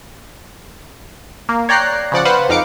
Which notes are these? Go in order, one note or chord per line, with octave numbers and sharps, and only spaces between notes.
A#3
C#5 D5 G5 A#5 F#6 C7
C#3 F3 D5 F#5
B4 C5 F5 F#5
F2 D#4 F5 D6 C#7